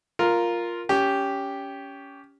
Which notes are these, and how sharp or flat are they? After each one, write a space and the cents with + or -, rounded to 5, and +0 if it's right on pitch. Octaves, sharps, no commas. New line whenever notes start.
F4 +0 A#4 +0
C#4 +20 G4 +0